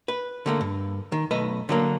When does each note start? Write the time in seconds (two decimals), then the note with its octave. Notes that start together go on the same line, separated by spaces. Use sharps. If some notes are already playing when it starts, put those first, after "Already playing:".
0.08 B4
0.46 D3 A3 A#3
0.61 G2
1.12 D#3
1.31 B1 A3 B4 D#5
1.69 D3 F#3 A#3